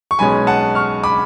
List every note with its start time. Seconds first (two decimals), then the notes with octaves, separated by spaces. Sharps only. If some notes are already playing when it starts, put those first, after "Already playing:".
0.11 C#6
0.19 B1 B2 G#3 C#4 G#5 B5
0.47 F#5 A5
0.75 C#6 F6
1.03 B5 D6